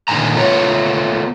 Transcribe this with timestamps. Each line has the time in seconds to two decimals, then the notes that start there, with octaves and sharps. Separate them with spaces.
0.08 A#2 D3 D#3 G3 G#5 A#5
0.36 A3 B3 F4 C#5